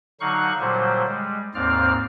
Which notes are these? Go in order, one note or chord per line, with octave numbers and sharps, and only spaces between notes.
D3 F#3 D#4 F5 C#6 F#6
A#2 D3 F#3 G3 C5
G3 G#3
D#2 G#2 C4 D5 F5 F6